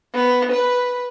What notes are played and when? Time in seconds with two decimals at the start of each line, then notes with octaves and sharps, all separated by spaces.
0.13 B3
0.52 B4